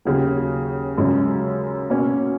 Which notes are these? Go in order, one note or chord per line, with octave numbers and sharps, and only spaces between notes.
D#2 C#3 F#3
F#2 C#3 G#3 C#4
B2 A#3 C#4